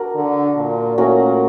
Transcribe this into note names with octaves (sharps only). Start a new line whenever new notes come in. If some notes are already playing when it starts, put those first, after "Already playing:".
Already playing: D4 F#4 A#4
D3
A#2
A#2 A3 C#4 F#4 A#4